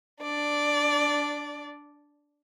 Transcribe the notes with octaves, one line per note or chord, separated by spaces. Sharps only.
D4 D5